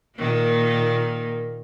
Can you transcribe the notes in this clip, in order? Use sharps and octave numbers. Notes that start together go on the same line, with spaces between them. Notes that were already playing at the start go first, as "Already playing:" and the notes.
A#2 D#3 A#3